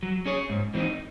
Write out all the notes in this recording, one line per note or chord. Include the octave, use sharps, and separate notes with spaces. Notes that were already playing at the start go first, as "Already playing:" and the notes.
F#3
C#4 G#4 C#5
G#2
E3 C4 D#4